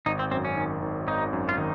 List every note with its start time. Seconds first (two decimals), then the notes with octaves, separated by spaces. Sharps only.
0.06 G#1 D#4
0.19 C4
0.31 F#2 C4
0.45 C#4
0.56 D#3
0.82 G#1
1.07 G#1 D#4
1.33 F#2
1.49 F4
1.58 D#3 D#4